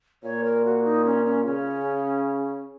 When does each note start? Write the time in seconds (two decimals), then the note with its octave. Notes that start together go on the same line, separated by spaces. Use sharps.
0.23 A#2 C#5
0.44 A#4
0.65 F#4
0.84 D#4
1.05 C#4
1.25 C#4
1.45 C#3 C#4